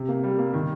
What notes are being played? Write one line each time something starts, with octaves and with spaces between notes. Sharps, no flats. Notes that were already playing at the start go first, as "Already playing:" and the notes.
Already playing: C3
A#3
G3
A#3
D#3